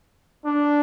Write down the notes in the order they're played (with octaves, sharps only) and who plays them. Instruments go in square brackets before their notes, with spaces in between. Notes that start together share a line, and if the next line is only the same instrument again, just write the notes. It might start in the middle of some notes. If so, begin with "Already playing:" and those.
[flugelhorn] D4